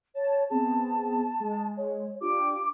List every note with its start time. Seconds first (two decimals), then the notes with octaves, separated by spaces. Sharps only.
0.15 C#5 A5
0.50 B3 C4 G#4 A5
1.40 G#3
1.77 C#5
2.21 D4 F4 G4 D6